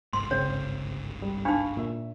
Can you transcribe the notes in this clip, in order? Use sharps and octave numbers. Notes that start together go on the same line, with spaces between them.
G1 C2 G#2 C6
C#3 C4 C#5
G3
D4 D#4 F5 B5 C#6
A#2 E5